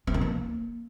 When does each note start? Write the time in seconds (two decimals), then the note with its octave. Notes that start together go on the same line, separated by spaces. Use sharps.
0.07 C4
0.14 D#3
0.21 A#3